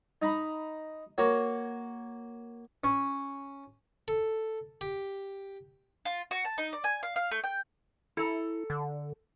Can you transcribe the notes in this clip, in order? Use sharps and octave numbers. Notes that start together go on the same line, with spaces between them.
D#4 A#5 B5
A#3 F#4 C#5
C#4
A4
G4
F4
F#4
A5
D#4
D5
G#5
F5
F5
A3
G5
E4 A4 A#5
D3